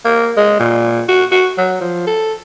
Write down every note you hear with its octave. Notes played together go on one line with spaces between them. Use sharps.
A#3
G#3
A#2
F#4
F#4
F#3
F3
A4